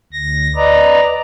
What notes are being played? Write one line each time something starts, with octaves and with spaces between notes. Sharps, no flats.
D2 A#6
B4 D5 D#5 A#5